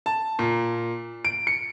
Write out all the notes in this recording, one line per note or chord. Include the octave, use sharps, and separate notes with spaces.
A5
A#2
D7
C#7